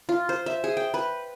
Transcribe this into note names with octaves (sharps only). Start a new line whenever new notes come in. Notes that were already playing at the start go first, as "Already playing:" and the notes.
F4
C5
E5
G#4
G5
B4